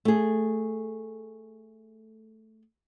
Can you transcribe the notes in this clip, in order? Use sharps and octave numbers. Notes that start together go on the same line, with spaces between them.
A3 G#4